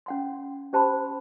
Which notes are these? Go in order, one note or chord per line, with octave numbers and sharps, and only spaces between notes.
C#4 F#5 C6
C#4 G4 C5 A5 B5 C6